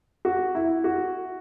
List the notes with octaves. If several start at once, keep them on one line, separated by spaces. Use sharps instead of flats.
F#4
E4
F#4